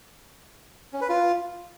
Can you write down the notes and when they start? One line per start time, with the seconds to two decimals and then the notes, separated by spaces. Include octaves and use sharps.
0.93 C#4
1.01 B4
1.09 F4